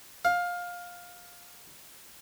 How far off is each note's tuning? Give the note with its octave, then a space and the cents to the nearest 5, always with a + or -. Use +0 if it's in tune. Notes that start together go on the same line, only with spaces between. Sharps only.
F5 +15